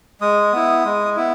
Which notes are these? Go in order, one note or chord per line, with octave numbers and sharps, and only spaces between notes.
G#3 D#6
B3 E4
G#3
B3 E4